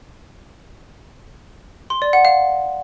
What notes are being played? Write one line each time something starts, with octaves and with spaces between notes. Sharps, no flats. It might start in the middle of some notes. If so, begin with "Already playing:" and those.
C6
D5
F#5
F5